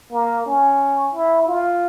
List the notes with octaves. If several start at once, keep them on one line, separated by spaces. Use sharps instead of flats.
A#3
C#4
E4
F4